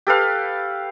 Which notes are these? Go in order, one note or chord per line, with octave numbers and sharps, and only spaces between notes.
G4 A4 B4 F5